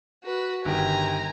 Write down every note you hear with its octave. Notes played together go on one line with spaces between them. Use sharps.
F#4 B4
G1 D#3 G4 G#5 A#5